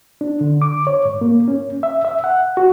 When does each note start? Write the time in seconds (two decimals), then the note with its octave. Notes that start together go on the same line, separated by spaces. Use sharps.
0.21 D4
0.41 D3
0.62 D6
0.87 C#5
1.05 G#2
1.21 A#3
1.48 C#4
1.83 E5
2.05 E5
2.24 F#5
2.57 F#4